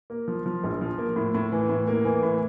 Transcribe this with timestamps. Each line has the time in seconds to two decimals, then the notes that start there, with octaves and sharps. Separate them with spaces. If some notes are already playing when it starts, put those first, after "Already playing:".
0.10 A#3
0.28 F3
0.46 F3
0.64 A#1
0.81 F3
0.98 A#3
1.16 A2
1.35 A2
1.52 E3
1.69 A2
1.88 A#3
2.05 E3
2.23 A2